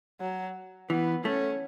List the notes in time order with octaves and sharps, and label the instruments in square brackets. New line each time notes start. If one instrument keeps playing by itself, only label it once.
[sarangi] F#3
[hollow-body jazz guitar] E3 [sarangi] B3
[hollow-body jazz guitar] A3 [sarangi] C#4